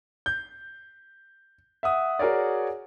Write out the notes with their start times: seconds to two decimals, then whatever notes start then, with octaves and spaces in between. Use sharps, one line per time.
0.26 G6
1.83 E5 F#5 D#6
2.19 F#4 G#4 A#4 C#5 D5